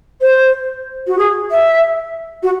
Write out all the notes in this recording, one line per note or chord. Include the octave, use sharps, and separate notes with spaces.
C5
F#4
G#4
E5
F#4